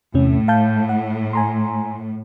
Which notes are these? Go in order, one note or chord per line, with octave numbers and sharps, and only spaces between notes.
E2 A2 C3 C#4
F5 A5 G6
F#5
G#5 A#5 C6